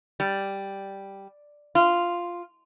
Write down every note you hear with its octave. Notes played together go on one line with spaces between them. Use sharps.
G3
F4